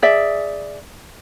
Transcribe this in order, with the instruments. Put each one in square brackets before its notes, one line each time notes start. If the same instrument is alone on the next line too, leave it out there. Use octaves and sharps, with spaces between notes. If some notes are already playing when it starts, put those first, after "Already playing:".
[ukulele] G#4 D5 E5